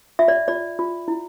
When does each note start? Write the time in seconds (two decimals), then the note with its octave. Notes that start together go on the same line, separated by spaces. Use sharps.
0.19 F4 E5
0.28 D5
0.48 F4 D5
0.79 F4
1.08 E4